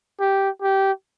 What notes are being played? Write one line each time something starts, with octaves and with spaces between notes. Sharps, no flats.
G4
G4